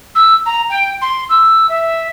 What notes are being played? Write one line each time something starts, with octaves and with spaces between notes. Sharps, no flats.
E6
A#5
G5
C6
E6
E5